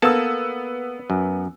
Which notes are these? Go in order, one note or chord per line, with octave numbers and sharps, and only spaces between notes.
A#3 B3 A4 A5 E6
F#2